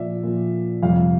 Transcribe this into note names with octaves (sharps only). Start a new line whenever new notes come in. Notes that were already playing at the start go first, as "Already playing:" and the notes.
Already playing: A#2 F3 D5 E5
A#2 F3
F2 C3 G3 F5